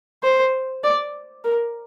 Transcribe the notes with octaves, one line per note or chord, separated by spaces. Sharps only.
C5
D5
A#4